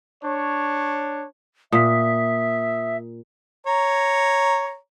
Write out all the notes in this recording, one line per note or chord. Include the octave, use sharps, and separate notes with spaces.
D4 C#5
A#2 E5 D#6 B6
C#5 A#5